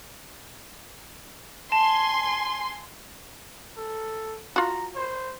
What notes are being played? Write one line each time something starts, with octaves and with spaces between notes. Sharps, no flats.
G#5 A5 C6
A4
F4 F#4 A#5
C5